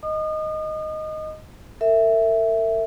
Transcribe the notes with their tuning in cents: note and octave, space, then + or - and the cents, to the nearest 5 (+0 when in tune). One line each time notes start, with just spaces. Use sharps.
D#5 +0 D#6 -40
A#4 -45 E5 +0